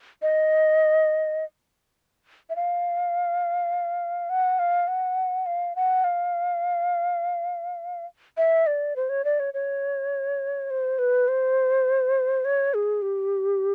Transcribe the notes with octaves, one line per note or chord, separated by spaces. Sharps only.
D#5
E5
F5
F#5
F5
F#5
F5
F#5
F5
E5
D5
C5
C#5
D5
C#5
C#5
C5
B4
C5
C#5
G#4
G4